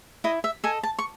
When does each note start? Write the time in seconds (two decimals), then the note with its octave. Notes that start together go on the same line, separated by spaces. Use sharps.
0.24 E4 D#5
0.44 E5
0.64 A4 D#5 G#5
0.83 A5
0.99 C#6